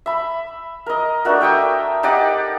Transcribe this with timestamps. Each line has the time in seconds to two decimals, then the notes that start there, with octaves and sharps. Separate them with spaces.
0.06 E5 B5
0.86 A#4 D#5
1.25 A3 D4 F#4 A#4
1.41 E5 G5 C#6 D#6
2.03 D#4 G4 D5 F#5